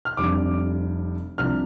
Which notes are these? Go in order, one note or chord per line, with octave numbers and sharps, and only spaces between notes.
F6
F1 F2 C3 G3 D4 D6
C2 C3 F3 D4 F6